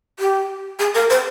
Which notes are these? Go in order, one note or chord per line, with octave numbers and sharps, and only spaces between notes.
G4
G#4
A#4
C5